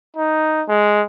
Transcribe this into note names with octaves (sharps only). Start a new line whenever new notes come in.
D#4
G#3